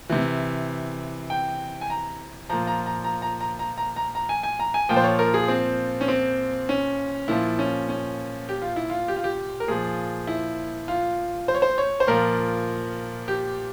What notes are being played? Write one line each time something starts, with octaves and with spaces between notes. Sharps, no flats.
C3 E3
G5
G#5
A#5
A#2 F3 A#5
A#5
A#5
A#5
A#5
A#5
A#5
A#5
A#5
A#5
G#5
G#5
A#5
G#5
A#2 F3 G5
C5
C#5
A#4
G#4
C4
C#4
C4
C#4
A#2 F3 E4
C#4
C#4
G4
F4
E4
F4
G4
F4
G4
A#4
A#2 F3 G#4
E4
F4
C5
C#5
C5
C#5
C5
A#2 F3 A#4
G4